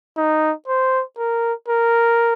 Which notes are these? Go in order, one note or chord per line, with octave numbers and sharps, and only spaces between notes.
D#4
C5
A#4
A#4